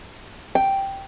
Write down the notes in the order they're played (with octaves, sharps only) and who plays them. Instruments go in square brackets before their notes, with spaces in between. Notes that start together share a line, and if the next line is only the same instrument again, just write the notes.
[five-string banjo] G5